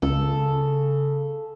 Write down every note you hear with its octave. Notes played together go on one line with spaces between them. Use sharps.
C#2 C#3 A4